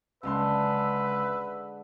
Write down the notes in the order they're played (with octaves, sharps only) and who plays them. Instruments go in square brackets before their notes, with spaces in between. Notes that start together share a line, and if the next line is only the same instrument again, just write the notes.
[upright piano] F#1 C#2 C6 [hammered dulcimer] D3 G#3 [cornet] B4 [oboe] E5